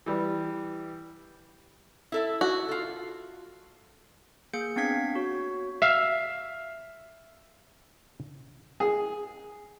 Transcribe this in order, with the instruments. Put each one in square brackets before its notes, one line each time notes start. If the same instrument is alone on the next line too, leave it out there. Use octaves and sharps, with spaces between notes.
[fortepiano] E3 G3
[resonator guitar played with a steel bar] E4 A4 E5
[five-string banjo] F#4
[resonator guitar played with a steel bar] F4 A4
[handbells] A#3 G#4 G6 C#7
B3 C4 D4 F5 G#6 B6
F#4 C#5
[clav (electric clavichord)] E5 F5
[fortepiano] G#4